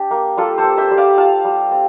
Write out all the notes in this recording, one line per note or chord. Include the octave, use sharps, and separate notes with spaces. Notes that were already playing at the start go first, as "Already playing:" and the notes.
Already playing: D4 G4
A#3
G3 F4 A4
A4 C5
C4
C5 E5
G3
D5 F5
F4 F5 A5
G3
C4